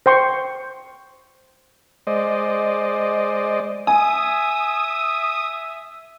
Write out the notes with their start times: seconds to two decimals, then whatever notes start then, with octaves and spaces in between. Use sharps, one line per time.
0.06 C5 G5 C6 C#6
2.07 G#3 C5 D5 D#5
3.87 E5 G#5 D#6